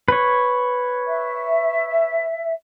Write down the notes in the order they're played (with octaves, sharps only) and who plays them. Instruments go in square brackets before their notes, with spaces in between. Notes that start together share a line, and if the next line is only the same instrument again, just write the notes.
[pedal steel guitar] B4 C#5
[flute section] E5